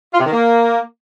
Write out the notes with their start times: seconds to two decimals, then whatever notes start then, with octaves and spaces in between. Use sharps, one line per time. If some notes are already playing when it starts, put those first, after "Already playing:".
0.14 F4
0.20 C3
0.26 D#3
0.32 A#3